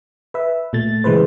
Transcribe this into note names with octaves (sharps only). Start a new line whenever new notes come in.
B4 E5
A#2 A3 A6
C#3 E3 G#3 B4 C5